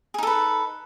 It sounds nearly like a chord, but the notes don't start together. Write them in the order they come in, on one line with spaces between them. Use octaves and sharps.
G#4 D#4 A4 B4